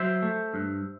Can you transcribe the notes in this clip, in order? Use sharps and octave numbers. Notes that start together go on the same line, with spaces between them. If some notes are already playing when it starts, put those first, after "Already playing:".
Already playing: F#3 C5 E5
A3
G2